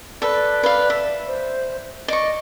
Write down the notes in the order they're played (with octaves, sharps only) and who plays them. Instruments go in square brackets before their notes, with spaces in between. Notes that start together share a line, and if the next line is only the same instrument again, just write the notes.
[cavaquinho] A4 B4 [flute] D5
[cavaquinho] B4 F5
E5
[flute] C5
[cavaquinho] D5 C#6 [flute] D#5